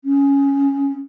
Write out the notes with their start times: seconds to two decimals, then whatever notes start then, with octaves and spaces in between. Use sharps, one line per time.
0.04 C#4